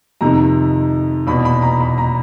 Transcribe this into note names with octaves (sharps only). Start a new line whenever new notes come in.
F2 C3 D#3 A#5
E2 B2 B5
B5
A#5
B5
A#5